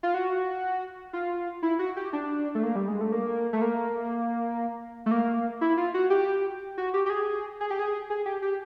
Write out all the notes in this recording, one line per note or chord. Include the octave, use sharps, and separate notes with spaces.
F4
F#4
F4
E4
F#4
G4
D4
A3
A#3
G3
G#3
A3
A#3
A3
A#3
A3
A#3
E4
F4
F#4
G4
F#4
G4
G4
G#4
G#4
G4
G#4
G#4
G4
G4